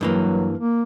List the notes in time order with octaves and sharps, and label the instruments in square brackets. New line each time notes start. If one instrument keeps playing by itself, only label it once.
[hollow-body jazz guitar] G2 E3 A#3 [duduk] F#3
[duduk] A#3